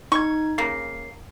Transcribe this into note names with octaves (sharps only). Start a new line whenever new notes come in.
D#4 C#6 G#6
C#3 A#3 C7